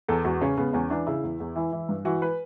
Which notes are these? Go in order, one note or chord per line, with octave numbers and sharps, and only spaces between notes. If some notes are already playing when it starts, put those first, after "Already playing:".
E2 A4
E2 F#4
C#3 C#4
C#3 B3
E2 C#4
E3 D4
C#3 E4
E2
E2
E3
E3
G2
E3 F#4
B4